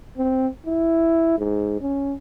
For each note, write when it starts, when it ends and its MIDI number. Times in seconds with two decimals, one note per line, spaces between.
0.18 0.47 60
0.67 1.37 64
1.38 1.77 44
1.81 2.14 61